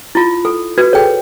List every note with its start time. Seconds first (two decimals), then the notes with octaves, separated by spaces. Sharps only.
0.15 E4 F4
0.45 A4
0.78 F#4 B4 G#6
0.93 G#4 A4 C5 C#5 G5